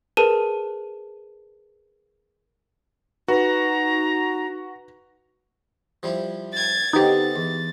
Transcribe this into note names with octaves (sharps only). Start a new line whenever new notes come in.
G#4 A#4 B4 A5 D#7
D#4 F#4 B4 A#5
F3 G3 E4
G#6 A6
D3 B3 C4 D#4 G4 A6
E2